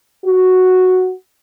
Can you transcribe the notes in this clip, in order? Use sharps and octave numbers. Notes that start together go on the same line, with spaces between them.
F#4